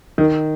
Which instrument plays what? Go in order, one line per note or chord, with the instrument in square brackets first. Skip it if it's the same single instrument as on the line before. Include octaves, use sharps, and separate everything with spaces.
[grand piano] D#3